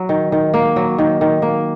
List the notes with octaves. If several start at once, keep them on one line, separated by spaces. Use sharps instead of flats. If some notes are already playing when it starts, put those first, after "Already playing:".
Already playing: F#3
D#3
D#3
A#3
F#3
D#3
D#3
A#3